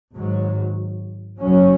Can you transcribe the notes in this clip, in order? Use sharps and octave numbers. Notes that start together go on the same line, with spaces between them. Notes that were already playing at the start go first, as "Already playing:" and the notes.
G#1 G#2 F#3
F#1 F#2 F#3 C#4